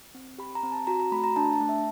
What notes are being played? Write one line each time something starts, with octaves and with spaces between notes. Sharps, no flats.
C4
G4 B5
A#5
C4
A5
F#4 A#5
A#5
A3 B5
A#5
D4 A5
A5
A3
E5